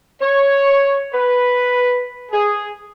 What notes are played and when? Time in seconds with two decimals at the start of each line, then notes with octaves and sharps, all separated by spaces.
0.21 C#5
1.13 B4
2.32 G#4